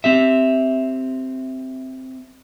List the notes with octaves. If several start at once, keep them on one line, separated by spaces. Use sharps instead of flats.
C4 G4 E5